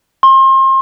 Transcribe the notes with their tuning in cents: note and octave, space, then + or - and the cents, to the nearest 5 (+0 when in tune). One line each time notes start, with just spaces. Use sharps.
C6 +35